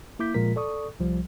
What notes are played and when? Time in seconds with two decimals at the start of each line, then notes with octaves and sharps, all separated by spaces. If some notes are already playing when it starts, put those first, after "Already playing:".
0.19 A#3 E4 D6 G6 B6
0.34 A#2 F3 G#3 F4 A#4 B6
0.56 A4 D5 C#6 D#6
1.00 C2 F3 G3